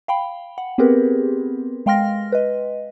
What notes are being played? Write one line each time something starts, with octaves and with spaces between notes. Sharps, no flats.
F5 G5 B5
F#5
B3 C4 G4 G#4 A#4 B4
G#3 F5 G5 C6 F6 A#6
B4 D#5